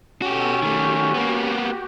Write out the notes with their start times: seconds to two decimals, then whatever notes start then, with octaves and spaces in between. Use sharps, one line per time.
0.22 B2 C#4 F#4 G4 A4 D#7
0.62 D#3 A3 F#4 G4
1.14 A#3 B3